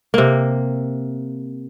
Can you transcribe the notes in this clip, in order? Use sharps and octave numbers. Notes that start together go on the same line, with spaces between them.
C3 A#3